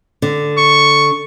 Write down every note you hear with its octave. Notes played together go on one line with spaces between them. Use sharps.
D3
C#6